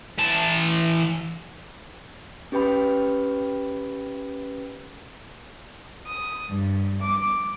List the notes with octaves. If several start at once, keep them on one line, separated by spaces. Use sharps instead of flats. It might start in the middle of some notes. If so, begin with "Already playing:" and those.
E3 A5
C#4 G4 B4 G5 B5
D#6
G2
D6